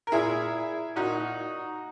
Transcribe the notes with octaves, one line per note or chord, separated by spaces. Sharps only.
A#4
A#2 E4 G#4
A#2 D#4 F#4